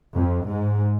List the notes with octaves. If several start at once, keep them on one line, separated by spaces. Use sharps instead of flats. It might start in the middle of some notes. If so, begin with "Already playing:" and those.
F2
G#2